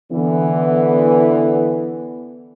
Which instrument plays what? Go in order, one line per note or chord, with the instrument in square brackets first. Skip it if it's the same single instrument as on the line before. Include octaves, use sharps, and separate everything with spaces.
[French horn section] D3 E3 B3